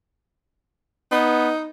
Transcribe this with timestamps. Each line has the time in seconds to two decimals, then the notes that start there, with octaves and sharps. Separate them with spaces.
1.12 B3 D#4